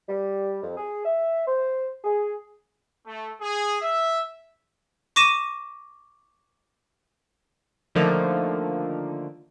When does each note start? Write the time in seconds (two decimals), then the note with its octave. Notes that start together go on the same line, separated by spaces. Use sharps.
0.09 G3
0.63 F2
0.77 G#4
1.05 E5
1.47 C5
2.04 G#4
3.05 A3
3.41 G#4
3.82 E5
5.16 C#6 D6 A#6 D#7 E7
7.95 D3 D#3 F3 A3 A#3 D#4